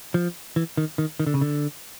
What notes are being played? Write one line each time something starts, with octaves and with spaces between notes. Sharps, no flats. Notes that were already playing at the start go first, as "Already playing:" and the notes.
F3
E3
D#3
D#3
D#3
D3
C#3
D3